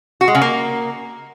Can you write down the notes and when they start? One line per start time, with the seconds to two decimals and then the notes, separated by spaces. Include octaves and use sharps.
0.21 F#4
0.28 G#3
0.35 C#3
0.42 A#3